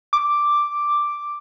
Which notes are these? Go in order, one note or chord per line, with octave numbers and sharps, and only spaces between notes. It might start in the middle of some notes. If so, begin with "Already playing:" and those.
D6